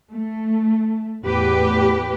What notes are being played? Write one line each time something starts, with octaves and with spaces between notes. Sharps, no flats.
A3
E2 A2 G4 B4